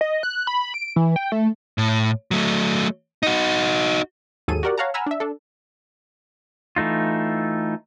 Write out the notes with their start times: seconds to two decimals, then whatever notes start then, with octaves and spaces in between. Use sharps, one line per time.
0.01 D#5
0.23 F#6
0.47 B5
0.74 D7
0.96 E3
1.16 G5
1.32 A3
1.78 A2
2.31 F#3 A3
3.23 D#4 F#4
4.48 D#2 G#2 F#3 G#4 A4 D#7
4.63 F#4 G4 A#4 D5 F#5
4.78 C#5 F5 F#5 A5 A#5
4.94 F#5 G#5 A#5 B5 E6 F6
5.06 D4 E5
5.20 D4 A4
6.76 E3 A3 D#4 F4